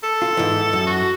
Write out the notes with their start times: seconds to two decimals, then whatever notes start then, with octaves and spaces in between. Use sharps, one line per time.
0.03 A4
0.22 F4
0.37 G#2 E3
0.73 F#2
0.87 F#4